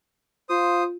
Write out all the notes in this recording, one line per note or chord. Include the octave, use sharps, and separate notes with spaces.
F4 C5 D#6